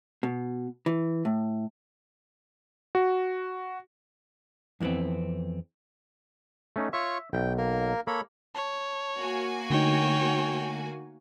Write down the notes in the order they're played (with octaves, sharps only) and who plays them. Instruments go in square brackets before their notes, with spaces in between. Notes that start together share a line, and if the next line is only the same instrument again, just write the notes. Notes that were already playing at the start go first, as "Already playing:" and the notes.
[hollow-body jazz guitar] B2
E3
A2
[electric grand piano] F#4
[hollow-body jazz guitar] F2 E3 G#3 B3 C4
[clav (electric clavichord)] A3 C#4 D#4
[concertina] F4 C#5 C#6 [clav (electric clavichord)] E5
[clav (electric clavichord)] B1 [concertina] G5
[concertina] A#3 A#4
[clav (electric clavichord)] A#3 [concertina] A4 C#5 B5
[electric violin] C#5 [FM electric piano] A5
[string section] A#3 F#4 G#5
[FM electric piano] D3 A3 D#4 [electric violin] C#5 G5